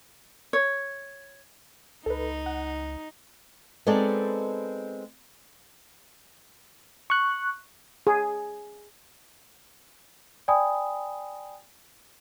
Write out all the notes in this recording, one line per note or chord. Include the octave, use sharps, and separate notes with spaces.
C#5
C#2 D#4 A4 B4
F#5
G#3 B3 C4 D#4 A4 D5
C#6 F#6
G#4
D5 G5 G#5 B5 D#6